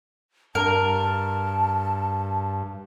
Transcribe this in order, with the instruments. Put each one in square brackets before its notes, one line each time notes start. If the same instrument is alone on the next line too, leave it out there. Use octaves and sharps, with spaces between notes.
[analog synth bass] G2 [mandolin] A#4 [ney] A5